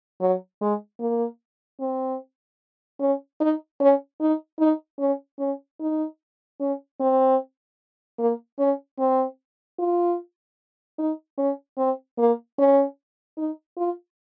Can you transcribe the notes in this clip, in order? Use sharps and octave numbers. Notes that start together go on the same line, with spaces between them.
F#3
G#3
A#3
C4
C#4
D#4
C#4
D#4
D#4
C#4
C#4
D#4
C#4
C4
A#3
C#4
C4
F4
D#4
C#4
C4
A#3
C#4
D#4
F4